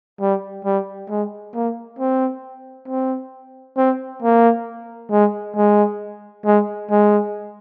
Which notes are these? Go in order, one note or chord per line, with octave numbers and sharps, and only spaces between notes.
G3
G3
G#3
A#3
C4
C4
C4
A#3
G#3
G#3
G#3
G#3